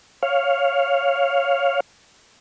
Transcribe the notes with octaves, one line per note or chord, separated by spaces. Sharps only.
C#5 F5